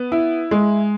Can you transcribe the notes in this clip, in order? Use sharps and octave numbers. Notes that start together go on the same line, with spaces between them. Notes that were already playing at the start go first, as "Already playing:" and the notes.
Already playing: B3
E4
G#3